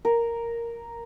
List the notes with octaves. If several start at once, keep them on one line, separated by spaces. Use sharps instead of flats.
A#4